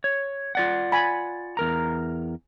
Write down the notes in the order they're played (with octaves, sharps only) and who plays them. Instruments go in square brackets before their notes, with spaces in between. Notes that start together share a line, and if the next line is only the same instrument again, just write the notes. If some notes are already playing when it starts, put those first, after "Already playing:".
[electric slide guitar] C#5
F4 D5 F#5
[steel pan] G#5 B5
[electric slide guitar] E2 A#4 A#5